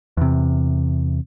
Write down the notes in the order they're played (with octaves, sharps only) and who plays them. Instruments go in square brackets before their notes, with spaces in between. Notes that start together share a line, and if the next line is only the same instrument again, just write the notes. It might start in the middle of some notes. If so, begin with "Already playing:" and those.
[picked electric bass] E2 C3